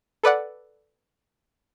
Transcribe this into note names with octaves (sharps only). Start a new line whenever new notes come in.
A4 B4 D5 F#5